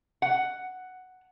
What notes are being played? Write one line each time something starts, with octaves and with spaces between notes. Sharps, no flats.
F#5